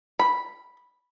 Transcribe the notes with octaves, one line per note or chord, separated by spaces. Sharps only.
B5